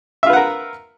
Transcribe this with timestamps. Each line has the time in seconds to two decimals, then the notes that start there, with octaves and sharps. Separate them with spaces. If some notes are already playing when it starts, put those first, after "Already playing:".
0.23 E5
0.26 F4
0.30 B4
0.33 F#5
0.37 A#4